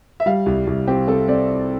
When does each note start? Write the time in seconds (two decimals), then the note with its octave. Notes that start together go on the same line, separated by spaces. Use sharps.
0.20 E5
0.26 G3 F5
0.46 C2
0.67 C2
0.88 C4 G4
1.08 C4 A4
1.28 C4 D5